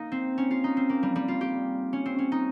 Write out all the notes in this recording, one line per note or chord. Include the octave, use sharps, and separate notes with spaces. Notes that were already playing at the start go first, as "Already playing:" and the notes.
Already playing: A#3 D#4
C4
C#4
F4
D#4
C4
A#3
G3
G3
F4
G4
C#4
C4
C#4
D#4